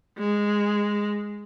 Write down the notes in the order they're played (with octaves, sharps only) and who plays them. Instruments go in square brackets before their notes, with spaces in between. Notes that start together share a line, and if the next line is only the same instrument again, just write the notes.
[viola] G#3